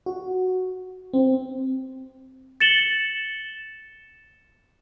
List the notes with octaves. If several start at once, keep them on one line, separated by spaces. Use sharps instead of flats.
F#4
C4
A6 C#7 E7 F#7 G7